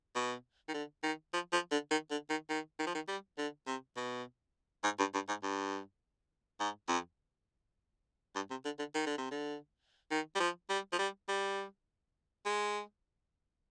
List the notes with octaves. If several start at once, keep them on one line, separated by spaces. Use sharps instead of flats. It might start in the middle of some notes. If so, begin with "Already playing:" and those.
B2
D#3
D3
D#3
F3
F3
D3
D#3
D3
D#3
D#3
D#3
F3
D#3
G3
D3
C3
B2
G#2
G2
G2
G#2
G2
G#2
F2
G2
C3
D3
D3
D#3
D3
C3
D3
D#3
G3
F3
G3
F3
G3
G3
G#3